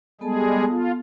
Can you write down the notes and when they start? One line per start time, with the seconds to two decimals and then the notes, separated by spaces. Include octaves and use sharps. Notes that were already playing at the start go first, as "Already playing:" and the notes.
0.21 G3 G#3 B3 G#4 A4 A5
0.70 F4